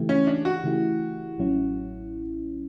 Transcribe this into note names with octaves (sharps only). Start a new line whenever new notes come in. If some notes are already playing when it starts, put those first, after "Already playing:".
Already playing: C#3 E3 A3 E4 G4
C#4
D4
F#4
C#3 E3 A3 E4 G4
A1 A2 F#3 C#4 E4